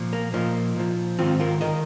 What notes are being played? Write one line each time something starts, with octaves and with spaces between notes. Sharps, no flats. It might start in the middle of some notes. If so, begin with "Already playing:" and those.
Already playing: A#2 F3
A#3
A#2 F3 A#3 D#4
A#2 F3
G#2 D#3 C4 F4
F4 A#4
D#3 A#4 D#5